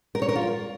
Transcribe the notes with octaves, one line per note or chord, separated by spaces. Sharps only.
A#4
C#5
A#4
F4